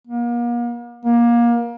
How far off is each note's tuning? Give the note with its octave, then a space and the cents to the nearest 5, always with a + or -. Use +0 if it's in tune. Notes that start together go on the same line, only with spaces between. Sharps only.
A#3 +40
A#3 +25